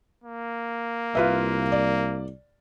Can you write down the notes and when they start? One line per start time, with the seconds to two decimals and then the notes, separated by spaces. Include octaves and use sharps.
0.24 A#3
1.15 C2 F4 B4 E5
1.72 D5